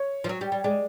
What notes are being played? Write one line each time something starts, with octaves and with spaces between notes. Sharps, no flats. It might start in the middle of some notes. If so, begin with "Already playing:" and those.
Already playing: C#5
F3
F#3
G3
G3
G#3 D5